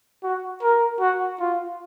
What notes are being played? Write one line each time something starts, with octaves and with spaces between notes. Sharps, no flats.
F#4
A#4
F#4
F4